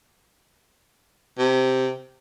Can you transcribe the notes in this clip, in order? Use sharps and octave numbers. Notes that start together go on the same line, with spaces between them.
C3